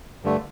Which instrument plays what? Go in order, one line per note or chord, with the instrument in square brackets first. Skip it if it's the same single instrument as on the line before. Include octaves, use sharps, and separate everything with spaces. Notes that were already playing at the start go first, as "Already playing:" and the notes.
[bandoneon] G2 D3 A3